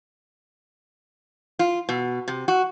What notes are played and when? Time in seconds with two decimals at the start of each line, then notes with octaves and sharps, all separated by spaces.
1.59 F4
1.89 B2
2.28 C3
2.48 F#4